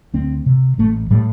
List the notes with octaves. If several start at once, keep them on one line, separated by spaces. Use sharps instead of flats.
D2 C4
C3
A1 A3
A2 G3